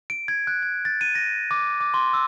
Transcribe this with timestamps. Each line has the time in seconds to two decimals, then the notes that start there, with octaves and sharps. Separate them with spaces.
0.10 D7
0.28 G#6
0.47 F#6
0.63 G#6
0.85 A6
1.01 D#7
1.15 A#6
1.51 D6
1.81 D6
1.94 C6
2.14 E6